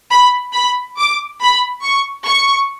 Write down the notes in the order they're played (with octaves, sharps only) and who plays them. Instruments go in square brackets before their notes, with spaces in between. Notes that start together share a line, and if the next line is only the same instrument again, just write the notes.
[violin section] B5
B5
D6
B5
C#6
C#6